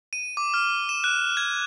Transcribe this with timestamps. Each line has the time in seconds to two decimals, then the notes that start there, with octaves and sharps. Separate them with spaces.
0.13 D#7
0.37 D6
0.54 F6
0.89 E7
1.04 F#6
1.37 G#6